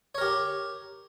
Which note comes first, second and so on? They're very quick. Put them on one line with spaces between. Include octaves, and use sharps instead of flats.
C#5 A#4 G4